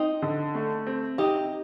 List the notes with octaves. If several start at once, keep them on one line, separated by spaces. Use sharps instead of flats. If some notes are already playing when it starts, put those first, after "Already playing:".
Already playing: C4 D#4
D3
A3
C4
C3 D#4 G4